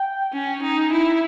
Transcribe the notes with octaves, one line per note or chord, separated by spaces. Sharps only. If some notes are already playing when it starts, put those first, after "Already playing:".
Already playing: G5
C#4
D#4
E4